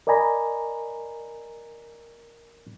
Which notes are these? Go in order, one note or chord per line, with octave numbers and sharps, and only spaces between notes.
A#4 D5 D#5 G#5 A#5 B5